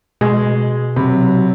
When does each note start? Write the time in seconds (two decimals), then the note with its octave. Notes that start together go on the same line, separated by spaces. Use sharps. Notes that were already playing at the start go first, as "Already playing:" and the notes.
0.21 B2 G#3
0.96 C3 F#3 B5